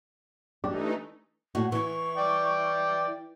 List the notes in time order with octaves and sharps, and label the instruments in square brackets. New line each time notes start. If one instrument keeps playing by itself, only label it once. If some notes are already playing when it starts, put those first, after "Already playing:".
[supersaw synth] E3 A3 D#4 [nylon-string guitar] D4 [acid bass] G4
[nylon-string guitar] A2 F#4
[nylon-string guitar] E3 [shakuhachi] C#6
[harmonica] D5 G5